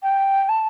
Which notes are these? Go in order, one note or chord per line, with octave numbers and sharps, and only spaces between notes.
G5
A5